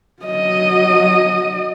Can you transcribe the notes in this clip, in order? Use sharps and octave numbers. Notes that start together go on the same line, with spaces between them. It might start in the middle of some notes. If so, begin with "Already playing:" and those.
F#3 D#5